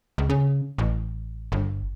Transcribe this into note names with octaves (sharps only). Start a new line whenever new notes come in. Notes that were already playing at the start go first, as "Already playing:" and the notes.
C#2
C#3
A1
G1